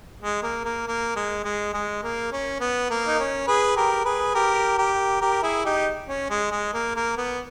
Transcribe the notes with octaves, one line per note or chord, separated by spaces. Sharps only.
G#3
A#3
A#3
A#3
G#3
G#3
G#3
A#3
C#4
B3
A#3
D#4
C#4
G#4 B4
G4 A#4
G#4 B4
G4 A#4
G4 A#4
G4 A#4
E4 G#4
D#4 G4
C#4
G#3
G#3
A#3
A#3
B3